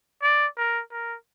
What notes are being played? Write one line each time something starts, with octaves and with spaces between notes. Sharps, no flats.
D5
A#4
A#4